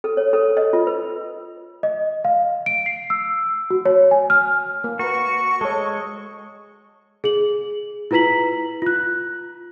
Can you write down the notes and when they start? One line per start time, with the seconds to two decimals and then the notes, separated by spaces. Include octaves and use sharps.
0.04 A4
0.17 C#5
0.33 A4
0.57 D#5
0.73 F4
0.87 B4
1.83 D#5
2.25 F5
2.66 D7
2.86 C7
3.10 E6
3.70 F#4
3.85 C#5
4.11 G#5
4.30 F6
4.84 A#3
4.99 F#4 A#4 B4 C#6
5.61 G#3 A4 C#5
7.24 G#4 F#7
8.11 E4 F4 B4 A#5 B6 F#7
8.82 F4 F#6